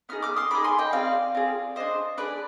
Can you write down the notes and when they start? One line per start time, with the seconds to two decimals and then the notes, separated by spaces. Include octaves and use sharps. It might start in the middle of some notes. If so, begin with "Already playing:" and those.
0.09 B3 D#4 G#4 F6
0.22 D6 F6
0.36 C6 D#6
0.50 B3 D#4 G#4 B5 D6
0.64 G#5 C6
0.78 D#5 G5
0.92 C4 F4 G#4 D5 F5
1.35 C4 F4 G#4
1.76 D4 G#4 C5 D#5
2.17 D4 G#4 B4 D5